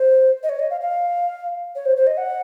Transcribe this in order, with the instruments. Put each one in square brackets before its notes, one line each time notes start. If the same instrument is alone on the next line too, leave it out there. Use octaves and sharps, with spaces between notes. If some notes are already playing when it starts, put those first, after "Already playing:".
Already playing: [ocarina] C5
D#5
C#5
D#5
F5
F5
C#5
C5
C5
D#5
F#5